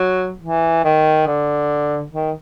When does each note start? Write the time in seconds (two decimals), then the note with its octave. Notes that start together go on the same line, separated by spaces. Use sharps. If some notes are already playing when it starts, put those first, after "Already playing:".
Already playing: F#3
0.41 E3
0.84 D#3
1.27 D3
2.12 D#3